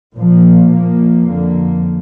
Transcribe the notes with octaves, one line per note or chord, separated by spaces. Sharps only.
A#2 F3 A#3
A#2 F3 A#3
F2 D3 A#3